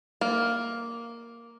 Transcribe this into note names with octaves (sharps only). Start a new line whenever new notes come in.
A#3